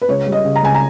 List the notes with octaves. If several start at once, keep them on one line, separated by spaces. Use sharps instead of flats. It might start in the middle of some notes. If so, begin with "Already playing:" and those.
B4
C#2 C#5
G3
D#5
C#3
A#5
C#2 G#5
A#5